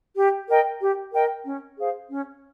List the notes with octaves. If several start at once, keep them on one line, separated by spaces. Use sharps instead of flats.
G4
A#4 D#5 G5
G4
A#4 D#5 G5
C#4
G#4 C5 F5
C#4